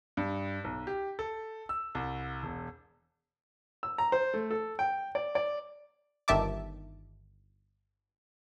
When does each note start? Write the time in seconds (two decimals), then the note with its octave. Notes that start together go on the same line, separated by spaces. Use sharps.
0.17 G2
0.64 B1
0.87 G4
1.19 A4
1.69 E6
1.95 C2
2.43 E1
3.83 E6
3.98 A#5
4.12 C5
4.34 A3
4.51 A4
4.79 G5
5.15 D5
5.35 D5
6.28 G1 D#3 E5 A5 D6